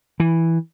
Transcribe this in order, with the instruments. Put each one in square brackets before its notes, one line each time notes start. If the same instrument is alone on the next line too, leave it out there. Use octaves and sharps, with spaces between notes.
[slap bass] E3